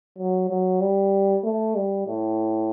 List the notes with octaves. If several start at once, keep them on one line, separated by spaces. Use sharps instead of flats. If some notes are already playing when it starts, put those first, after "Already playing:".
F#3
F#3
G3
A3
G3
A2